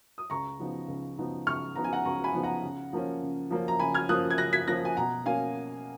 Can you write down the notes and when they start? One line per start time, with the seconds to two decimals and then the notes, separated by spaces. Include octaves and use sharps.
0.18 D#6
0.30 C#2 A#5 C#6
0.59 C#3 F3 B3 D#4
0.88 C#2
1.18 C#3 F3 B3 D#4
1.47 C#2 C#6 F6
1.76 C#3 F3 B3 D#4 A#5
1.84 G#5
1.93 F#5 A#5
2.05 C#2 A#5 C#6
2.24 G#5 B5
2.34 C#3 F3 B3 D#4
2.43 F#5 A#5
2.63 C#3
2.93 F3 A#3 C#4
3.22 C#3
3.50 F3 A#3 C#4
3.68 A#5
3.79 C#3 G#5 B5
3.94 F6 G#6
4.09 F3 A#3 C#4 D#6 F#6
4.30 G#6
4.38 C#3 F#6 A#6
4.53 G#6 B6
4.67 F3 A#3 C#4 F#6 A#6
4.85 G#5
4.96 B2 F#5 A#5
5.26 A#3 C#4 F5 G#5